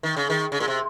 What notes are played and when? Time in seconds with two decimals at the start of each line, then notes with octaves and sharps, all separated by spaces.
0.03 D#3
0.17 C#3
0.30 D#3
0.52 C#3
0.60 A#2
0.68 C3